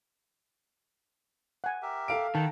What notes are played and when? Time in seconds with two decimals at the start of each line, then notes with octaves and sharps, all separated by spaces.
1.64 F#5 G#5
1.82 G4 A#4 E5
2.08 A4 F5 D7
2.35 D#3 F#5 G5 A5 A#5